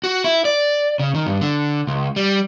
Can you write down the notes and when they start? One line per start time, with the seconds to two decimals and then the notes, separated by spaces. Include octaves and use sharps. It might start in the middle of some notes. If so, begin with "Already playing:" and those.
0.04 F#4
0.24 E4
0.45 D5
0.99 C#3
1.15 D#3
1.27 G2
1.41 D3
1.87 C#2
2.16 G3